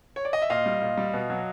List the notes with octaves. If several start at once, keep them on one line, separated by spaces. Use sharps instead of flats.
C#5
D5
D#5
E5
A#2 D#5 F5
G3
A#2
G3
B2
F#3